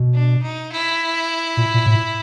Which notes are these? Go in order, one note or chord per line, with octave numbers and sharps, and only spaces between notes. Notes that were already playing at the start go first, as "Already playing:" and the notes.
Already playing: B2
D4
D#4
E4
A#2
A#2
A2